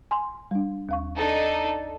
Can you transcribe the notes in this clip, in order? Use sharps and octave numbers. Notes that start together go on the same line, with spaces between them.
G#5 C6
G3 D4
D#2 F5 C#6
D4 D#4 A4